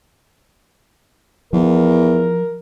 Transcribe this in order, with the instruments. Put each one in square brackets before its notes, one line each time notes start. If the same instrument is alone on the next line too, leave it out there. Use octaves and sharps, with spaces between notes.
[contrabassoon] E2 [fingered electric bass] F3 [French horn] A#4